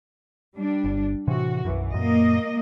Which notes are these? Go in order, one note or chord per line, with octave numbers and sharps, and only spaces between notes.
G3 D4
G1
A2 C3 E3 F#4
B1 F#2 E3
F#2 A#2 A#3 D#5